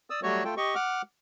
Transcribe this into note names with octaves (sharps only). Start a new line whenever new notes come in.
D5 D#6 E6
F#3 G3 A3 F#4 C#5
A3 F4 A4 G5
G4 D#5 C#6
F#5 D6 F6